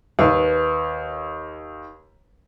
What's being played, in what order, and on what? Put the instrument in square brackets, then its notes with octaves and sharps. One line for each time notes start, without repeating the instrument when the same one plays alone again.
[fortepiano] D#2 [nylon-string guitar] B4